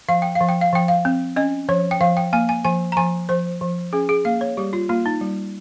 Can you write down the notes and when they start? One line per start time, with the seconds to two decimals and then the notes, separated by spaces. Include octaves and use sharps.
0.09 F3 F5
0.22 G5
0.35 F5
0.41 F3
0.49 G5
0.61 F5
0.72 F3 G5
0.88 F5
1.05 C4
1.36 C#4 D#5
1.69 F3 C#5
1.91 G5
2.01 F3 F5
2.17 G5
2.33 A#3 G#5
2.49 G#5
2.65 F3 G#5
2.92 A#5
2.97 F3 G#5
3.29 F3 C5
3.61 F3
3.93 C#4 G#4
4.09 G#4
4.25 A#3 F5
4.41 C#5
4.57 G3 G4
4.73 F4
4.89 A#3 F4
5.06 D#4
5.21 G3